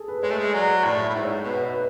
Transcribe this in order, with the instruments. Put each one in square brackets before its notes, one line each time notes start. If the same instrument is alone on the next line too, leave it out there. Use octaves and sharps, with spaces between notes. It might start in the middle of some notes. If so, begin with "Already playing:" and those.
Already playing: [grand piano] G#4 A4
B4
[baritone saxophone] G#3 [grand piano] C#5
[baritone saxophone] A3
G#3
[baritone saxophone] F#3 [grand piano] D5
[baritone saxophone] A2 [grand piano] D5
[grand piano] E5
[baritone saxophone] A2
G#2
[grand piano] C#5
[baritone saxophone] B2 [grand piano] B4
[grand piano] B4